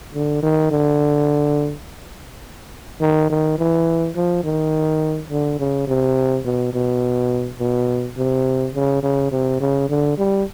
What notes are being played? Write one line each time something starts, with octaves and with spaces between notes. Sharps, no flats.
D3
D#3
D3
D#3
D#3
E3
F3
D#3
D3
C#3
C3
B2
B2
B2
C3
C#3
C#3
C3
C#3
D3
G3